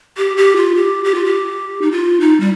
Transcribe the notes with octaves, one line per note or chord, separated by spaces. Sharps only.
G4
G4
F4
G4
G4
F4
G4
D#4
F4
D#4
G3